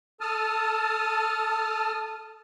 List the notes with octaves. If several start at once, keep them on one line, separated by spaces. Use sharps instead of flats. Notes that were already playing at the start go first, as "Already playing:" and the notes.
A4 A5 D#6 F6